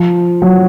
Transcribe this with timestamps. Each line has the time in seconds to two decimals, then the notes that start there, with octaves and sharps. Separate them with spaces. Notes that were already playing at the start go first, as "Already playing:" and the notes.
Already playing: F3
0.42 F#3